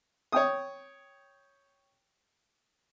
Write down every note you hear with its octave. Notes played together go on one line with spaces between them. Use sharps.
C#5 G5 D#6